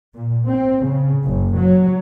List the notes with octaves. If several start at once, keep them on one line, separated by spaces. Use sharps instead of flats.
A#2
C4
C#3
F#1
F#3